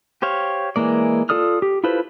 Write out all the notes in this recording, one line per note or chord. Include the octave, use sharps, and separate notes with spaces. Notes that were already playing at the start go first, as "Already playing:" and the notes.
G4 C5 C#5 F5
E3 G#3 A#3 D5
F4 A4 D5 D#6 F6
G4
E4 F4 A4 B4 C5